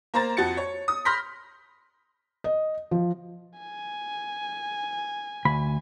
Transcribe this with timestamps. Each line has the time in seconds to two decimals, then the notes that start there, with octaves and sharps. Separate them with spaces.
0.14 A#3 C5 A#5 A6
0.37 F2 F#4 A6 C#7
0.57 C#5
0.88 D#6
1.05 B5 C6 F6 G6 A#6 B6
2.44 D#5
2.91 F3
3.58 G#5
5.45 D2 B5